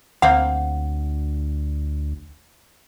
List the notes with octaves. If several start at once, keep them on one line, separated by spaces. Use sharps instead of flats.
D2 A#3 C4 F5 F#5